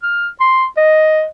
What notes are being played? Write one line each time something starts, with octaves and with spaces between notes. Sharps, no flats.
F6
C6
D#5